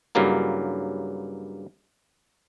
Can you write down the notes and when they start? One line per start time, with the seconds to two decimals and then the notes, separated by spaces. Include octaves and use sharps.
0.15 G2 C#3 F#3 A#3 E4